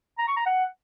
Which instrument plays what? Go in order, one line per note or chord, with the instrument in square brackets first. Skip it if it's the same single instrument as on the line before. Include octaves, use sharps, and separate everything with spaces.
[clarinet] A#5
C#6
A#5
F#5